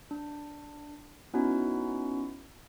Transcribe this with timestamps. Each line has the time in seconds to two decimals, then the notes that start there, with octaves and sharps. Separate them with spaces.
0.11 D4
1.34 B3 C#4 D#4 E4 F#4